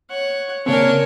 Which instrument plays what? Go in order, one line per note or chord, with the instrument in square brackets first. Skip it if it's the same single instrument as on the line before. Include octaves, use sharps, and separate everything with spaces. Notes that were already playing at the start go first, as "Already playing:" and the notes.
[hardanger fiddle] C#5 [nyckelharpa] F#5
[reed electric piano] C#3 A#3 C4 [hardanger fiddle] D4 G#5 [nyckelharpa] A#4 C#5